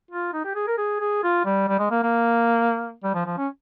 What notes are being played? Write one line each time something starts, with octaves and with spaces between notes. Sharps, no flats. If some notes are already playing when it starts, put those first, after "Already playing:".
F4
D#4
G4
G#4
A#4
G#4
G#4
F4
G3
G3
G#3
A#3
A#3
G3
F3
F3
C#4